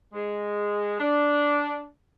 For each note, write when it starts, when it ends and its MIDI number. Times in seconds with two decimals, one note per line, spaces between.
0.13 0.98 56
1.00 1.87 62